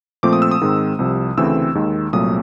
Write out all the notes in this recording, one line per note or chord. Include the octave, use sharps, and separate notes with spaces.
A#2 F3 A3 C4 D6
D#6
E6
D#6
G#2 D#3 G#3 C4
C2 C3 F3
D2 C#3 E3 A3 C4 E6
D#2 D#3 G#3
C2 A#2 F#3 A3 C4 D#6